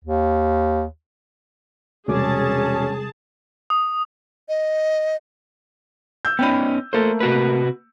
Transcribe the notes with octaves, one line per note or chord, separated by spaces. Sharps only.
D#2
E1 C3 G3 C#4 G#4 A5 D6
D#6
D#5
E6 G6
B3 C#4 D#4 G5 B5
A3 A#3 A4 C5
C3 F#4 B4